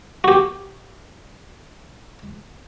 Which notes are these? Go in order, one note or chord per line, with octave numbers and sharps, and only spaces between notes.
F#4 G4